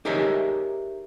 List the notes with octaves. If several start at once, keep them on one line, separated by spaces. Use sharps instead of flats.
D#4 G4 G#4 A#4 C#5 E5